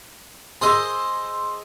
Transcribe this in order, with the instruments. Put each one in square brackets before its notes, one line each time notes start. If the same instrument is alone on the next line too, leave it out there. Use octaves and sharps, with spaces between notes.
[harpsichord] G#4 C5 D#5 [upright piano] C6 E6